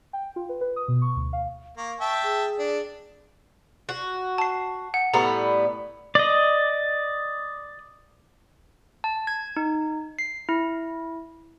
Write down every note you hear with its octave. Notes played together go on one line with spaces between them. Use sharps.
G5
F4
B4
B4
D#6
B2
C#6
D2
F5
A#3 C#6
E5 G5 A5
G#4
D4
F#4
A5 C7
F#5
A2 G3 B3 A#5
D5 D#5
A5
G#6
D#4
C7
E4